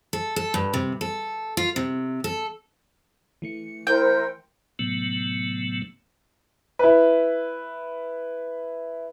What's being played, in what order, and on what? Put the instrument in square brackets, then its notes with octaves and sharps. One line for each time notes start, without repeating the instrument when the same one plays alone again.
[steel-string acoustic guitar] A4
A4
G2
C3
A4
F4
C3
A4
[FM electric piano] E3 A3 C#7
[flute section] E4 A#4 C5 [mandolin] G5
[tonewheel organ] A2 C3 F#3 A3 B3
[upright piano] E4 B4